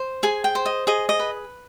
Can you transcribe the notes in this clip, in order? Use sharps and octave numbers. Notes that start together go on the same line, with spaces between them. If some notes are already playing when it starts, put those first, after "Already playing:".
Already playing: C5
G#4 G#5
G5
C5
D#5
G#4 D#5
D#5
B4